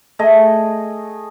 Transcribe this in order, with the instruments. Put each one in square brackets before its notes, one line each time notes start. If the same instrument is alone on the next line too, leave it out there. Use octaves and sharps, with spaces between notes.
[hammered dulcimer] A3 G#4 D#5